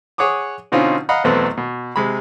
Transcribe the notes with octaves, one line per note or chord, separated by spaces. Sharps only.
G#4 C#5 F#5 D6 D#6
B2 D3 C4 C#4 D#4 F4
D#5 F5 F#5 A#5 B5
B1 E2 F#3 A3 B3 C4
B2
C3 G#3 B5